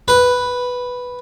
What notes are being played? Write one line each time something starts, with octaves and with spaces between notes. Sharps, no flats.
B4